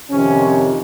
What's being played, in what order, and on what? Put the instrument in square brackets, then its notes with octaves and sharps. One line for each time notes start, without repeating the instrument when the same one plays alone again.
[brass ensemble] F2 C3 D#3 C#4